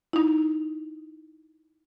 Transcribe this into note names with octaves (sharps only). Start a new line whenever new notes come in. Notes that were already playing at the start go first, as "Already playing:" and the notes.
D#4 E4